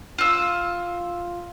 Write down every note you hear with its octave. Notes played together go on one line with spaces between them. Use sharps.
F4 E6